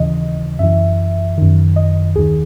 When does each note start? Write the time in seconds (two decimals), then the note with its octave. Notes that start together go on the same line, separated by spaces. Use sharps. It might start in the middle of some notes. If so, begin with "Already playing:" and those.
Already playing: D#2 C#3 E3 D#5
0.59 F#2 E3 E5
1.38 F#2 D#3
1.76 D#5
2.16 D#2 D#3 G#4